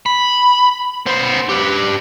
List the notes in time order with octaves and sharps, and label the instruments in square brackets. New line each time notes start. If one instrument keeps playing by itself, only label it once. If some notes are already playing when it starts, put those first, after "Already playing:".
[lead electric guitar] B5
B3 C5
G4 B4